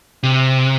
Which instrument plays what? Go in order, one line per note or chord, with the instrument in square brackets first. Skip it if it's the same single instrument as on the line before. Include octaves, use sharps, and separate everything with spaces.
[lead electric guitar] C3